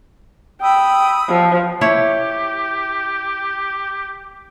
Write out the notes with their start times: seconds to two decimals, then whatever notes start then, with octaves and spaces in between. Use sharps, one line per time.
0.62 G5 B5 D#6 E6
1.30 F3
1.81 E4 G4 C#5